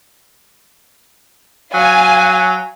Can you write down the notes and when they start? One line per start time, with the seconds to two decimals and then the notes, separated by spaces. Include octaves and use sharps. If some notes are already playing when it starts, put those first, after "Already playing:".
1.74 F#3 F5 G#5